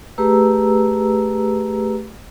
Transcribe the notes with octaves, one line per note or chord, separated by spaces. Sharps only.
A3 G4 G#4 B4 A#5 E6